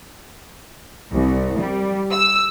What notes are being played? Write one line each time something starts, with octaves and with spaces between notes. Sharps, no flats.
C2
G3
E6